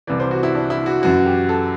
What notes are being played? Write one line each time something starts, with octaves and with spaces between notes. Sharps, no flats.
C2 C3 E3 D5
C5
F#4
E4
D4
E4
F#4
F#2 E3 F#4
G4
A4